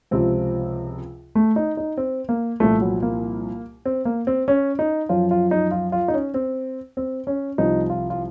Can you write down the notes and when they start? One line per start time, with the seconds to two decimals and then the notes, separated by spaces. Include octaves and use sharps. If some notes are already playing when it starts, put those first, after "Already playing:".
0.11 C#2 C3 F3 C4
1.35 A3
1.56 D#4
1.77 D#4
1.97 C4
2.29 A#3
2.60 C2 A#2 F3 A3
2.81 F#3
3.02 A#3
3.85 C4
4.05 A#3
4.27 C4
4.48 C#4
4.79 D#4
5.09 F#2 F3 F4
5.31 F4
5.51 D#4
5.71 F4
5.92 F4
6.08 D#4
6.14 C#4
6.34 C4
6.97 C4
7.27 C#4
7.58 C2 C3 F3 D#4
7.90 F4
8.10 F4